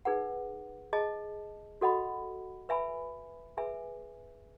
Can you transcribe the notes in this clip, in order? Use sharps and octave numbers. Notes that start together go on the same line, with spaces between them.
D#4 G#4 B4 F#5
G#4 D#5 A5
F#4 A4 D#5 F#5 B5
B4 E5 G#5 B5
G#4 B4 E5 G#5